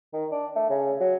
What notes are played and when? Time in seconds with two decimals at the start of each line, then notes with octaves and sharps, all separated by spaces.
0.13 D#3
0.32 D4
0.56 A3
0.70 C#3
1.00 F#3